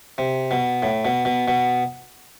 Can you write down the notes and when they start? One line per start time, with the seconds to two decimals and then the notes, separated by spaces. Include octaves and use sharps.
0.18 C3
0.51 B2
0.82 A2
1.05 B2
1.25 B2
1.48 B2